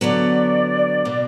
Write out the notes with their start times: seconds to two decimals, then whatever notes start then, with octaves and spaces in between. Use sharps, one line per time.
0.01 D3 F#3 B3 D5
1.05 B2 A#3